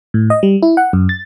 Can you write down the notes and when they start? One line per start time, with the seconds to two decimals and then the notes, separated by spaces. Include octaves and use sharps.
0.14 A2
0.30 D#5
0.43 G3
0.63 E4
0.77 F#5
0.93 F#2
1.09 A6